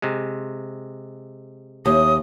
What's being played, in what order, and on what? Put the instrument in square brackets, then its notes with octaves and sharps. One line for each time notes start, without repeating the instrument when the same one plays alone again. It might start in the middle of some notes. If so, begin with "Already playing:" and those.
[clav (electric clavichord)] C3 G#3
[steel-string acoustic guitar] D#2 [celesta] G4 C#5 E5 [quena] D#6